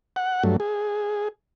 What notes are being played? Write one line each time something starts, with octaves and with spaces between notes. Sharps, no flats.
F#5
G2 F#3 A3
G#4